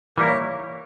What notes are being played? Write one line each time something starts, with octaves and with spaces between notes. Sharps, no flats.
E3 G3 A#3 E4 A#4
C#5